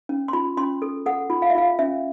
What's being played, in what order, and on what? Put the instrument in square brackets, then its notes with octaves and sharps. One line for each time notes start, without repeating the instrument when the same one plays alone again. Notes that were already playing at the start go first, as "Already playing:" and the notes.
[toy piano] C#4
C6
F4 B5
C#4 C6
A4
A4 F#5
F4
F5
E5
F4 F5
C#4 E5